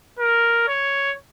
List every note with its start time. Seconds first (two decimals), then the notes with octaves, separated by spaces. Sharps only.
0.19 A#4
0.68 C#5